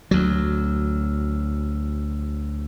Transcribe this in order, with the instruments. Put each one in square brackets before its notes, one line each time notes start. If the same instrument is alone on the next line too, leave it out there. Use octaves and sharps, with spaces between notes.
[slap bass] D2 F#3